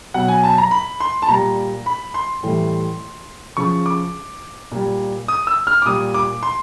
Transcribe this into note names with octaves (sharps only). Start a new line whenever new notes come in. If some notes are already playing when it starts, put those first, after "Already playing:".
B2 F#3 F#5
G#5
A5
A#5
B5
C6
A5
A#2 G3 A#5
B5
C6
A2 E3 G3
C#3 F3 C#6
D6
A#2 G3
D#6
E6
F6
D6
A#2 G3 D#6
D6
C6